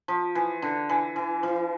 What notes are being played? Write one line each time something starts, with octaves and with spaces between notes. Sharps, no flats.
F3
E3
D3
E3
E3
E3